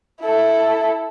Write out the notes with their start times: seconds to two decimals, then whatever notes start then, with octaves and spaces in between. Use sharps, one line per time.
0.21 E4 A4